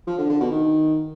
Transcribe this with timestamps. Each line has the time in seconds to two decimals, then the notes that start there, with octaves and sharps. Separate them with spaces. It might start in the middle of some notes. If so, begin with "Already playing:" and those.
0.07 F3
0.18 D3
0.29 D3
0.40 B2
0.51 D#3